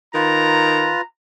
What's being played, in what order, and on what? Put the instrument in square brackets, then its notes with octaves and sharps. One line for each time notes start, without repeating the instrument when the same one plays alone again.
[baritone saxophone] D#3 [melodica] F4 B4 [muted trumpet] A#5